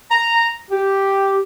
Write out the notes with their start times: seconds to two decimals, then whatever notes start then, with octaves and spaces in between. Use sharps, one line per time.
0.11 A#5
0.71 G4